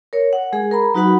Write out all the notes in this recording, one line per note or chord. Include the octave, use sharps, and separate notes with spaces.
A#4 C#5
F#5
G#3 G#4
A#4 A#5 B5
F#3 D#4 F#4 B4 F#5 B5